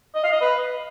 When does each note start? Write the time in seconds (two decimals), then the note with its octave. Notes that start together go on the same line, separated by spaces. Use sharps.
0.15 D#5
0.24 F5
0.33 D#5
0.41 B4